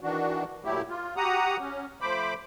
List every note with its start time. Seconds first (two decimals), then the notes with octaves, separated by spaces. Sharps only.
0.01 D#3 E3 D4 F#4
0.65 A#2 F#3 A3 E4 G4
0.89 F4
1.17 F#4 G4 F#5 A#5 D#6
1.59 C#4
2.01 F3 A3 C5 B5 D6